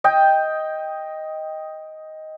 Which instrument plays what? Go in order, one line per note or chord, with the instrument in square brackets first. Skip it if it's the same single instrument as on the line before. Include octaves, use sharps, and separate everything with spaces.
[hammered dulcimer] D#5 G5